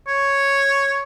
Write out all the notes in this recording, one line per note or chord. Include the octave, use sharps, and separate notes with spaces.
C#5